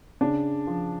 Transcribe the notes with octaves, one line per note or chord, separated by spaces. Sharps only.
C#3 D4
F3